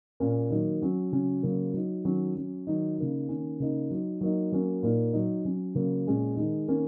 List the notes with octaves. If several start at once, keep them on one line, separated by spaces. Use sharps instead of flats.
A#2 A#3 C#4
D#3 F#3 A#3 D#4
F#3 C#4
C#3 F#3 C#4
C#3 F#3 A#3
F#3 D#4
D#3 F#3 C#4
F#3 C#4
D#3 F#3 D#4
C#3 A#3 D#4
D#3 A#3 C#4
C#3 A#3 D#4
F#3 D#4
F#3 A#3 D#4
F#3 A#3 C#4
A#2 A#3 D#4
F#3 D#4
F#3 C#4
C#3 F#3 A#3
A#2 G#3 C#4
D#3 G#3 D#4
D#3 A#3 C#4